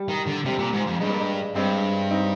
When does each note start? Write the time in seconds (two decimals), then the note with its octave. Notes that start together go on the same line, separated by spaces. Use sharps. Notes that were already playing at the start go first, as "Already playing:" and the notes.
Already playing: G3
0.08 D#3
0.27 D3
0.45 C3 G3
0.59 A#2
0.72 G#2
0.86 F2
1.00 G2 G#3
1.10 A#3
1.19 G#3
1.55 G2 G#3 C4
2.10 C4 D#4